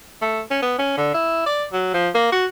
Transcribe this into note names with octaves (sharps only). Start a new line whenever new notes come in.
A3
C#4
B3
C#4
D3
E4
D5
F#3
F3
A#3
F#4